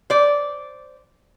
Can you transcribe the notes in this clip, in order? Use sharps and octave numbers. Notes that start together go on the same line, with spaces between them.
C5 D5